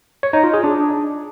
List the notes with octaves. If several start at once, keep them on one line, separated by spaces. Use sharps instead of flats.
C#5
D#4
F4
G#4
D4